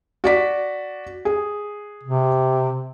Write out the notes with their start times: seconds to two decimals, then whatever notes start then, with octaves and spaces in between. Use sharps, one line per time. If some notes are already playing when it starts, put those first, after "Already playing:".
0.24 F#4 D5 B6
1.25 G#4
2.04 C3